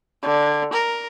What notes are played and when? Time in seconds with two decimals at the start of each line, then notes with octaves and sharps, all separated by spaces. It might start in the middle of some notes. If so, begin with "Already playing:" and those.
0.23 D3
0.73 A#4